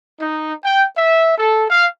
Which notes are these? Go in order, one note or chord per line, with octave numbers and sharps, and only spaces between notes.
D#4
G5
E5
A4
F5